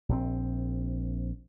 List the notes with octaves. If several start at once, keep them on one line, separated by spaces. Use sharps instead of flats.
A#1 D3 C4